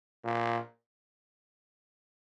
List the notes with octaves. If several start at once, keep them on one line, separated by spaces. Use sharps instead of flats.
A#2